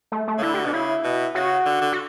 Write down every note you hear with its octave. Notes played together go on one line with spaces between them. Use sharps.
A3
A3
C#3
D3 E4
G4
F#4
B2 D4
C#3 E4
B2
C#3 F#4
D3
D3
F#4